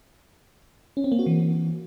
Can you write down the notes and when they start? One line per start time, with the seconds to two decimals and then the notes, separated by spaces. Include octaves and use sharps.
0.97 C#4
1.04 C4
1.12 A#3
1.19 F#4
1.26 E3